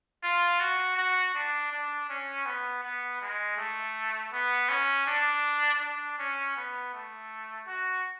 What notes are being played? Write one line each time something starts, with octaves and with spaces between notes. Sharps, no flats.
F4
F#4
F#4
D4
D4
C#4
B3
B3
G#3
A3
B3
C#4
D4
D4
C#4
B3
A3
F#4